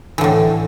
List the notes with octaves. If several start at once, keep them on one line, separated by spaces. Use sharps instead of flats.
A2 D3 E3